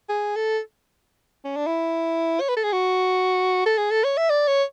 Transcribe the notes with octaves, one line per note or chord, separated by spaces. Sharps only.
G#4
A4
C#4
D4
E4
C#5
B4
A4
G#4
F#4
A4
G#4
A4
C#5
E5
D5
C#5